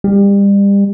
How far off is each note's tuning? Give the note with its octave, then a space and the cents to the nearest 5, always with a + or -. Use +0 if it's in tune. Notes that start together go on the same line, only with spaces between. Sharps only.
G3 +30